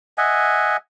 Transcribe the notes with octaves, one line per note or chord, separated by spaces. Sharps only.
D#5 E5 F#5 G#5